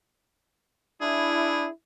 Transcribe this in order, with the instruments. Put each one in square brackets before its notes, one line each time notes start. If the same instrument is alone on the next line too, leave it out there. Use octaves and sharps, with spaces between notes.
[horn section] D4 E4 [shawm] G#4